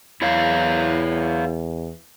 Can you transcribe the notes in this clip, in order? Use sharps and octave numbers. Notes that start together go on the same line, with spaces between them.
E2 E4 C#5 F5